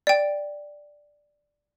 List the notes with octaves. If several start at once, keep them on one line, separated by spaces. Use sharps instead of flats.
D5 G5